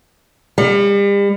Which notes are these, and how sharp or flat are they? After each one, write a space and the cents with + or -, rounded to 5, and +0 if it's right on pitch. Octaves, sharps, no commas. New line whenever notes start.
G3 +40